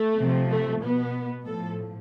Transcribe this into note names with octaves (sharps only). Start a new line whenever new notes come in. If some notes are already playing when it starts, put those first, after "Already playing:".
Already playing: A3
C3 F3
A3
B2 B3
A2 F3 A4